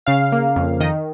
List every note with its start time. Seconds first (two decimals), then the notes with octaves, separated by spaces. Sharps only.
0.06 C#3 F5
0.32 A#3
0.56 F2
0.80 D#3 D#5